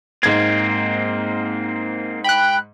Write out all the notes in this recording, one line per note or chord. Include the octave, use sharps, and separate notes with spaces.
G#2 A#3 C4 G#6
G5 B5 F#6